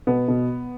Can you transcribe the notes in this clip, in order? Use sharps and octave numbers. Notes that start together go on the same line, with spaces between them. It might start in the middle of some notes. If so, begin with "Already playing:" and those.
B2 B3
B2